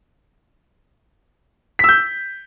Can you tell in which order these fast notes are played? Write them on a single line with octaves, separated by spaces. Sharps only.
B6 E6 G6